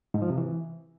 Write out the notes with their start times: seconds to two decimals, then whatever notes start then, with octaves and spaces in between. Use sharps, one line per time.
0.14 G#2
0.22 F3
0.30 C3
0.38 E3